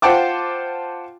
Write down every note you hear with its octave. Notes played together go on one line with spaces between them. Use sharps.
F4 C5 F#5 G5 A5 D6